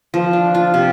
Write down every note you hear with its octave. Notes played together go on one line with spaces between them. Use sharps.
F3
D4
F4
C3